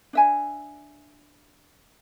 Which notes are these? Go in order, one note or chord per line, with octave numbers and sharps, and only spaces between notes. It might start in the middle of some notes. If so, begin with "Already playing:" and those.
D4 E5 G#5